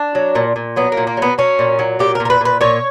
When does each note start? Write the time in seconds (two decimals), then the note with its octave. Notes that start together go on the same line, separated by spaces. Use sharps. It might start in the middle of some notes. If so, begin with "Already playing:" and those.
Already playing: D4
0.15 F#3
0.35 A#2
0.56 A#2
0.76 F#3 B3
0.92 A#3
0.97 A#2
1.07 A#3
1.17 F#3 B3
1.38 F#3 C#4
1.59 A#2
1.79 F#3
1.99 A#2 G4
2.15 A#4
2.20 A#2
2.25 A#4
2.30 B4
2.41 A#2 B4
2.61 A#2 C#5